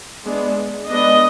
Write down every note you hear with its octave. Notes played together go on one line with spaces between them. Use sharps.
G#3 B3 D4
G#3 B3 D4 D#5